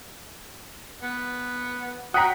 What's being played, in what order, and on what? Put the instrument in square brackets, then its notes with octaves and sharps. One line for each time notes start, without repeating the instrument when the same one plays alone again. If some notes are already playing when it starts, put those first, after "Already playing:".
[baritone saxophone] B3
[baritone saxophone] F#4 [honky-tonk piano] F#5 G5 B6 [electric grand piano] A#5 D#6